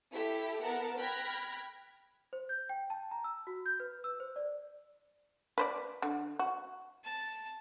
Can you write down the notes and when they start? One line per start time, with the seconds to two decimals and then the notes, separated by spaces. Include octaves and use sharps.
0.12 E4 G4 A4
0.62 B3 A#4 F#5 A5
0.98 G5 B5 F6 F#6 G#6 A#6
2.33 C5
2.49 G6
2.69 G5
2.90 A5
3.11 A#5
3.24 E6
3.47 F#4
3.66 G6
3.80 B4
4.04 E6
4.20 C5
4.36 D5
5.58 B4 C5 D5
6.02 D3
6.39 F#4
7.04 A5